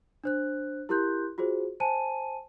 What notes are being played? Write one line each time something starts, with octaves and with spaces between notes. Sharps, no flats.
D4 C5 F#6
E4 G4 A#4 C6 F#6 G6
F4 F#4 G#4 C5
C5 G#5 A5 D#7